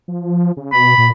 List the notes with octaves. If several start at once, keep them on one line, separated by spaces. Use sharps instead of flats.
F3
C#3
B2 B5
A#2